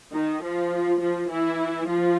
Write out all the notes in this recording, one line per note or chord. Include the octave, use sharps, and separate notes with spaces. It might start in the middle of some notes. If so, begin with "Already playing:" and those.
D#3 D#4
F3 F4
F3 F4
E3 E4
F3 F4